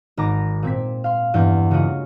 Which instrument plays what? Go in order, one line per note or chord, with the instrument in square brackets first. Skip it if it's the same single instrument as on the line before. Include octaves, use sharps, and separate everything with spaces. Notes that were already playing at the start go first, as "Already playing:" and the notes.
[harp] G#1 A#5 D6 A#6
A#2 C4 G#6 B6
F5 C6
E2 G2 G6
C#3 G#3 A#3 F4 F#4 G#4